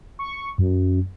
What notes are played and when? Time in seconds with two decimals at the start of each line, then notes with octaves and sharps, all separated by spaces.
0.19 C#6
0.58 F#2